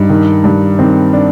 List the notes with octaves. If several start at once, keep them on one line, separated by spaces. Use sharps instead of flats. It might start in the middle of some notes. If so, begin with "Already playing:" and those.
Already playing: G2 D#4
D#3
G2
D#3 C4
D4